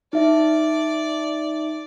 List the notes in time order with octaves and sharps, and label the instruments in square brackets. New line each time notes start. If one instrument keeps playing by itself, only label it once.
[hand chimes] D#4 E5 [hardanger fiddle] D5